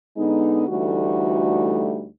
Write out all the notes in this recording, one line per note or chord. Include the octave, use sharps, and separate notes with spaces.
D3 G#3 B3 D#4
D2 E3 G3 A3 D#4 F#4